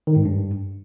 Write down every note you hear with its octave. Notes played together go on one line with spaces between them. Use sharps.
D#3
G#2
G2